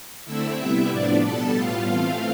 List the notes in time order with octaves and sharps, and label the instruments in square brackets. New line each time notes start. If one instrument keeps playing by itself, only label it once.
[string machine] D3 A3 C4 E4 E5
C3 G3 B3
A2 F3 B3 D4 D5
B2 G3 B3 A4 A5
A2 G3 B3 F4 F5
E3 A3 C4